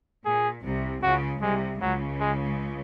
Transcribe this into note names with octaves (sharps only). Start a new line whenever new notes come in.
A#2 G#4
C2 C3
C#2 C#3 F#4
C2 C3 G#3
C#2 C#3 F#3
G#3